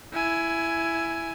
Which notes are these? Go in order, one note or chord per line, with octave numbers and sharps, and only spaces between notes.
E4 G#5